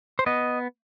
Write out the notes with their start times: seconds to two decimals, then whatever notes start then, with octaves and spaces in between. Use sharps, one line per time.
0.19 C5
0.26 B3 D#5